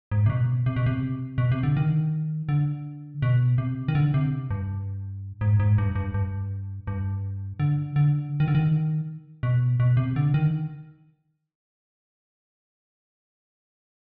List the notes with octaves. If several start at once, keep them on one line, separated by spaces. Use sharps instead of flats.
G#2
C3
B2
C3
B2
C3
B2
C3
D3
D#3
D3
B2
C3
D#3
D3
C3
G2
G#2
G#2
G2
G2
G2
G2
D3
D3
D#3
D3
D#3
B2
B2
C3
D3
D#3